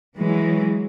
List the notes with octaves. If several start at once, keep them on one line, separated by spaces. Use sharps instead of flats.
E3 F#3 G#3